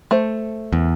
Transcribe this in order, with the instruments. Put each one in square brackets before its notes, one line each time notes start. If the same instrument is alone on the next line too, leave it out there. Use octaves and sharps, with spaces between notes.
[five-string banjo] A3 C5
[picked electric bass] E2